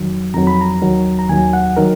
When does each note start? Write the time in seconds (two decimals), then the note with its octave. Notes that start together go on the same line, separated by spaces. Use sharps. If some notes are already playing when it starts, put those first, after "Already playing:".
Already playing: F2 D#3 F#3
0.34 F2 D#3 F#3 A#5
0.47 B5
0.61 A#5
0.82 D#2 D#3 F#3
1.19 A#5
1.29 D#2 D#3 F#3 G#5
1.53 F#5
1.77 D#3 F#3 A#4